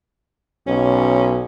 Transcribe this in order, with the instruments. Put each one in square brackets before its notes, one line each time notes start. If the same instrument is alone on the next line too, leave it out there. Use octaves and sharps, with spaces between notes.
[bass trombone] B1 [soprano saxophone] C#4